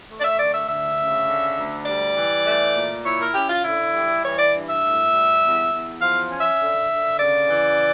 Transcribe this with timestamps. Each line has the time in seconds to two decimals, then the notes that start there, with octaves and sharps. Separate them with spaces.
0.09 A3
0.19 D5
0.23 E5
0.38 D3 D5
0.53 E5
0.67 D2 E5
0.97 C#3
1.27 D3
1.57 D2
1.86 G3 D5
2.16 E3
2.45 A3
2.75 A#2
3.04 E4 C#5
3.20 A#4
3.34 C#4 G4
3.49 F4
3.64 D3 E4
3.93 G3
4.23 E3 C#5
4.38 D5
4.53 G2
4.68 E5
4.83 A2
5.13 G3
5.42 E2
5.72 E2
6.01 F3 F5
6.31 C#4
6.40 E5
6.60 D3
6.90 D3
7.19 C#3 D5
7.49 E3